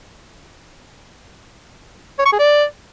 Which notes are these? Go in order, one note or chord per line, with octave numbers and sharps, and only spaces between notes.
C#5
C#6
G#4
D5